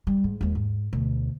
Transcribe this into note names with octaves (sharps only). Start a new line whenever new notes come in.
G3
G#2
D#2 G#3
G#2
D2 B2